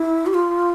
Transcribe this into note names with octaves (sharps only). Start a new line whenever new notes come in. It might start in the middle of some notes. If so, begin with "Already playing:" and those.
Already playing: E4
G4
F4